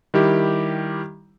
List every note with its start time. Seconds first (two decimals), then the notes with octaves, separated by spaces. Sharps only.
0.14 D#3 G3 E4 G4